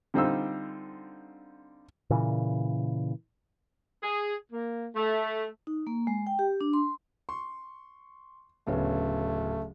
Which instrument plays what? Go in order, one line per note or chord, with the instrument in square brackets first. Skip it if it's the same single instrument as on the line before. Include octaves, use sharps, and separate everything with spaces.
[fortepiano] D3 G3 C4 D#4 F4 E6
[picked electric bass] A#2 C#3 E3
[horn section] G#4
A#3
A3
[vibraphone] D#4
A#3
G#3
G5
G4
D4
C6
[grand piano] C6 [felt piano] C#6
[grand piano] D1 [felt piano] C#3 B3 C#4 [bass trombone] A3